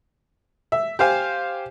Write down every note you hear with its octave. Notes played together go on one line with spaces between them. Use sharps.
E5
G4 C5 F5 G#5